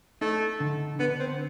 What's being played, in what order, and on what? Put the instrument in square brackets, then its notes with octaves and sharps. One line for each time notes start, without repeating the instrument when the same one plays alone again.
[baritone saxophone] A3 [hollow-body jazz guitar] D#4
[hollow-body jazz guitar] D3
[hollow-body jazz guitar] D3 [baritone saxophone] B3
[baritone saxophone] C4